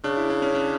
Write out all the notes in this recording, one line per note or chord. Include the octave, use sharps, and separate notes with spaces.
C#3 D4
E4
D4
C#4
D4